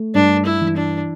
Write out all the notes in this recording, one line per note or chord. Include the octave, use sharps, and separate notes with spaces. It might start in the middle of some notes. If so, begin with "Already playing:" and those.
Already playing: A3
G2 D4
E4
E3
D4